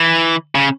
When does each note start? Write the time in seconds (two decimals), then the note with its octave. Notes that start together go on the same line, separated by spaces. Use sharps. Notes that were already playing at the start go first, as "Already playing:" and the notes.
Already playing: E3
0.55 C#3